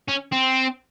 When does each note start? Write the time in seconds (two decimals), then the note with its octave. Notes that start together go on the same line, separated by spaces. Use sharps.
0.09 C#4
0.33 C4